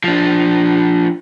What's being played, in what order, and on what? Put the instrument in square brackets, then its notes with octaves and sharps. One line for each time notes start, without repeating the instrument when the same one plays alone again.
[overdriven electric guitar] F3 D4